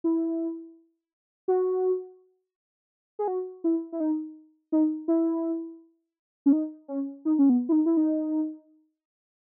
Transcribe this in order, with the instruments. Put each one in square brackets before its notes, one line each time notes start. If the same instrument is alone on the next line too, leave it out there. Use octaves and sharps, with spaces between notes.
[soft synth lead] E4
F#4
G#4
F#4
E4
E4
D#4
D#4
E4
C#4
D#4
C#4
D#4
C#4
B3
E4
D#4
E4
D#4